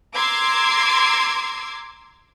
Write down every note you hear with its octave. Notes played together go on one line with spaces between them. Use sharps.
A#5 C6 D6 E6 G#6 C7